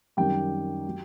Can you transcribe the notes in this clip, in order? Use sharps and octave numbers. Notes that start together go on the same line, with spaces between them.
F#2 D#3 G3 G4 G5
F#3